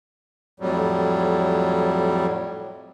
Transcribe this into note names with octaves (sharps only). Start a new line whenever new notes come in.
F2 A2 F#3 G3